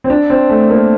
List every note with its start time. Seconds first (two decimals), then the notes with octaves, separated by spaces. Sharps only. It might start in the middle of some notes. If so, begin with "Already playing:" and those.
0.04 C4
0.10 D4
0.30 C4
0.50 A3
0.70 A#3